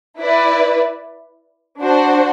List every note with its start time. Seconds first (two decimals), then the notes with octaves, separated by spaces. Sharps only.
0.20 E4 B4 D5
1.81 D4 F#4 C5